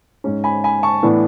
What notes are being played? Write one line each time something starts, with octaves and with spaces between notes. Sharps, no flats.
G#2 G#3 C#4
G#5 B5
G#5 B5
A5 C#6
A2 E3 B3 D4